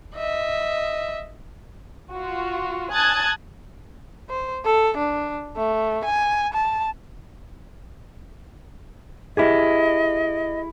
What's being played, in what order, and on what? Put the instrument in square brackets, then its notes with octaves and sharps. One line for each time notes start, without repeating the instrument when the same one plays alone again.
[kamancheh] D#5 E5
[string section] F4 F#4
G#5 A5 D#6 F#6 G#6 A6
[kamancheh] C5
A4
D4
A3
G#5
A5
[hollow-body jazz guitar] E4 G4 G#4 [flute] D#5